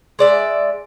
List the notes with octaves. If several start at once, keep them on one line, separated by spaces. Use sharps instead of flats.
G#3 D5 E5